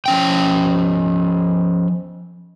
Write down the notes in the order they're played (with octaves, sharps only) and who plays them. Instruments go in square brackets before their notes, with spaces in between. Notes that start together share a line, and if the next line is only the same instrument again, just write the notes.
[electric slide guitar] F3 C#4 G5